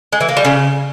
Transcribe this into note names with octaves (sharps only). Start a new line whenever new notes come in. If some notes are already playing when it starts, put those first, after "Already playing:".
G#3
E3
A#3
G3
C#3